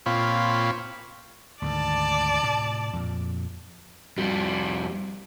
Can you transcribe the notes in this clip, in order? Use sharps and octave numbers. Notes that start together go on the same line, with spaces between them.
A#2 C4 F4 C#5 B5
D2 G#2 D#3 D5 A5
A2 C3
F2 A#2
F2 G3